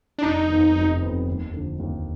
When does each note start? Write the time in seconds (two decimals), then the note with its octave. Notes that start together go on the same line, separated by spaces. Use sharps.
0.18 D4
0.22 F1 D#4
0.48 F2 D#3 B3
0.75 F1
1.01 F2 D#3 B3
1.27 D#2
1.53 D3 F3
1.79 D#2